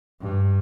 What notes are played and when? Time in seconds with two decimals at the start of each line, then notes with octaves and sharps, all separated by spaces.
0.21 G2